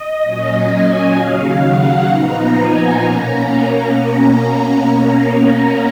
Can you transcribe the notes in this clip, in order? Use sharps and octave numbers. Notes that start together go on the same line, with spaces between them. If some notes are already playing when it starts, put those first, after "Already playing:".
Already playing: D#5
A#2 F#3 C#4
G#5
D#2 C#3 F#3 F5
F#5
A#2 F3 B3 D#4 A#5
G#5
B2 A#3 C#4 A#5